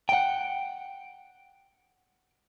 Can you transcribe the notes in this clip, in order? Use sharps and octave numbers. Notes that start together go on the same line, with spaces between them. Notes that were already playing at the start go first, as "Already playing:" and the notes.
F#5 G5